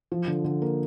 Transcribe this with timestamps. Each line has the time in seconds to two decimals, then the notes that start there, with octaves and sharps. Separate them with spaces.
0.12 F3
0.27 D3
0.44 D3
0.62 A#3